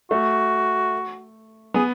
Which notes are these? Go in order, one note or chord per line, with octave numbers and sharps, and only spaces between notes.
A3 F#4
B3 G#4